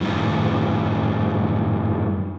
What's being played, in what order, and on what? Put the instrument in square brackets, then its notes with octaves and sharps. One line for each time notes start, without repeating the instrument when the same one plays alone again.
[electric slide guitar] F#2 A2 D#3 G3